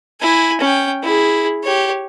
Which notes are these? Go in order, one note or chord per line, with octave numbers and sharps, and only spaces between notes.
E4 G#5
C#4 G5
E4 G#4
G4 C#5